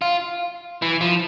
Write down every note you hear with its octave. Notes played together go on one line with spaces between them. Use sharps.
F4
E3
F3